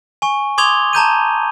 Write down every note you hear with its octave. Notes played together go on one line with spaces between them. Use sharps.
G#5 C#6
C6 D6 D#6 G#6 F7 G7
A5 A#5 G6 D#7